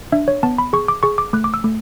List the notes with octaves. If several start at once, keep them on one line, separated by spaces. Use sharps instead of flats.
D4 E5
C#5
B3 A5
B5
G#4 C#6
D6
G#4 C#6
D6
A3 F#6
D6
E6
A3